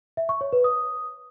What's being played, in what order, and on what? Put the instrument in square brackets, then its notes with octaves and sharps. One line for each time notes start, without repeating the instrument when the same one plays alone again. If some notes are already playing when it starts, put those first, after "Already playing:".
[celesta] E5
C#6
C#5
B4
D#6